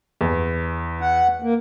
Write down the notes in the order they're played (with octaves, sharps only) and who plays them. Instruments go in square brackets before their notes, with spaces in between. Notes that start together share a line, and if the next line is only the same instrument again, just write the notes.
[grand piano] E2
[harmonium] F#5
A#3